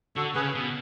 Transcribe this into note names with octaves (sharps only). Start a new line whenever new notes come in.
D3 F#4 A4
C#3 G#4 B4
B2